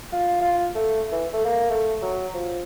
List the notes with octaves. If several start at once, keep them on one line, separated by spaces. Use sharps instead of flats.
F4
F4
A3
E3
A3
A#3
A3
F#3
F3